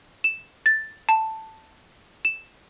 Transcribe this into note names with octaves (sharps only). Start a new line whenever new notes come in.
E7
A6
A5
E7